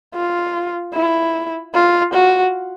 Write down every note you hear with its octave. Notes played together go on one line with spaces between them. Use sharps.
F4
E4
F4
F#4